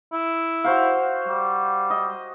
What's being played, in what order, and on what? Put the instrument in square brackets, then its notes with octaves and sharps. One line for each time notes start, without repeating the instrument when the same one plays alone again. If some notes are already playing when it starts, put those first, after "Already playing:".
[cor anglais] E4
[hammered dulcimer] F#4 C5 F5
[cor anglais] G3
[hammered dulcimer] D#5